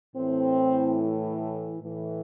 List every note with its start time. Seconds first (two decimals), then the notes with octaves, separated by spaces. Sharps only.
0.15 A2 E3 C4
1.81 A2 E3